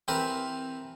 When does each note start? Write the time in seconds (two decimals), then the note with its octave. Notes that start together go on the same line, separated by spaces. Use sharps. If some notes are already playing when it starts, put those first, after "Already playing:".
0.08 E3 C4 G4 A#4 B4